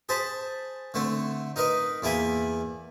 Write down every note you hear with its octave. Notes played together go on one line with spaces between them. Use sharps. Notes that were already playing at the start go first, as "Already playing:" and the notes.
G#4 C5 A5 B5
D3 A3 C4
D#4 A#4 B4 D#5
E2 A#3 E4 G#5 B5